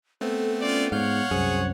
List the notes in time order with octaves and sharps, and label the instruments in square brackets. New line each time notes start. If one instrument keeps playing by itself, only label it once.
[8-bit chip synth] A3 B3 C4 [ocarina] A4
[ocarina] C#4 [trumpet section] F4 D5
[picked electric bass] G#2 [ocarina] B3 [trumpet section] C#5 F#5 [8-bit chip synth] F5 F6 G6
[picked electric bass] C2 F#2 [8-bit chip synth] G#4 [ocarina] C5